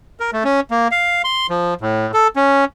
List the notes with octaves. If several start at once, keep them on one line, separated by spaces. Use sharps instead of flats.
A#4
A3
C#4
A#3
F5
C6
F3
A2
A4
C#4